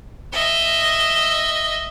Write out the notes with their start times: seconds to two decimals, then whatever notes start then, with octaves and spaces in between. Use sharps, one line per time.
0.33 D#5 E5